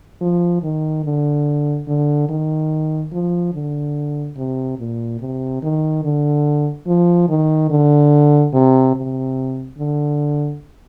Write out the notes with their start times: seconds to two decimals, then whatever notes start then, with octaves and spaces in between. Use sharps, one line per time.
0.21 F3
0.63 D#3
1.05 D3
1.88 D3
2.29 D#3
3.12 F3
3.54 D3
4.37 C3
4.79 A#2
5.21 C3
5.63 D#3
6.04 D3
6.87 F3
7.29 D#3
7.71 D3
8.53 C3
8.96 C3
9.78 D3